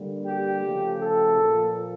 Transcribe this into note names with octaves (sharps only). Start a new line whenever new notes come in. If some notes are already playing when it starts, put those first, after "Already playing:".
Already playing: D3 G3 A#3
G4
C#3 F3 A3
A4
A#2 F3 A#3